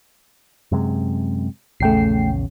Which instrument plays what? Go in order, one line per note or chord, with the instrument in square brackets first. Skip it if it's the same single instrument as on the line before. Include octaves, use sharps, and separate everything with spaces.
[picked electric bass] F#2 C3 G#3
[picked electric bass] A#1 E2 C#3 [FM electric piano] A3 G5 C7